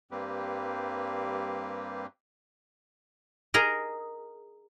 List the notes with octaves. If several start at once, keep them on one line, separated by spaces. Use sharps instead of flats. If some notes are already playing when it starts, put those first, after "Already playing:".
G2 G3 A#3 C4 G4 B4
G#4 A#4 D#5